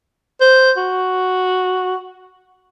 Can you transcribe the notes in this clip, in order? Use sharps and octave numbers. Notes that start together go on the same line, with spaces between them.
C5
F#4